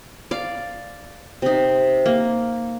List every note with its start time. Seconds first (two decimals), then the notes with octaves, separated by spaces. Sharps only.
0.31 D5 F5
1.42 C3 D#4
2.06 A#3